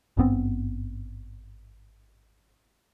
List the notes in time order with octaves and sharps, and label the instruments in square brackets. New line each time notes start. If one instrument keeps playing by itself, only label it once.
[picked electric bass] G#1 G2 B3 C4